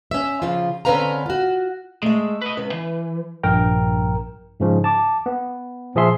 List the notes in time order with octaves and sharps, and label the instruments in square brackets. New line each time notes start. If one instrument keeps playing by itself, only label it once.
[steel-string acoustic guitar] C#4 E5
C#3 F3 F4
D3 C4 C#4 B4 F5 A#5
F4 F#4
[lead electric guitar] G#3 [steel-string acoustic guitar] A3 E5
[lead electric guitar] B4 D#5
[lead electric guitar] C#2 [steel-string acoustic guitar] B4
[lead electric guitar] E3
[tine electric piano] A#1 G2 A#4 G5 A#5
G#2 C#3 F3
A5 D6
B3
A#2 F3 G#4 E5 C6